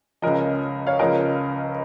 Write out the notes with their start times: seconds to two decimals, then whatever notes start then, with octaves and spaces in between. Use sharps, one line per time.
0.22 C#2 C#3 F3 A#4 D#5
0.87 C#5 F5
0.99 C#2 C#3 F3 A#4 D#5